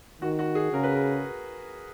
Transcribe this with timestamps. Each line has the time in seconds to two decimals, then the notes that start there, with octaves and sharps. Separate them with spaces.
0.21 D#3 F#4
0.39 F#4
0.55 G#4
0.72 C#3 A#4
0.83 B4
0.94 A#4